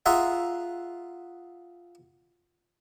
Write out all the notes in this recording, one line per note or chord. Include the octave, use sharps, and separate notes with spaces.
F4 G#4 E5 F#5 A#5